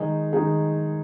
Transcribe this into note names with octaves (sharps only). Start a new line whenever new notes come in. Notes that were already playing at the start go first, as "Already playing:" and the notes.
Already playing: D#3 G#3 D#4 G#4
D#3 G#3 D#4 G#4